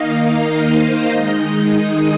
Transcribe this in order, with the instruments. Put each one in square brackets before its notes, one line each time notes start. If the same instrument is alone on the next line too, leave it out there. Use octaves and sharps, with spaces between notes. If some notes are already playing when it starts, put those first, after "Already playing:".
Already playing: [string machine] D#3 A#3 D#4 D#5 F5
D#5
C5
D#3 G#3 D#4 D#5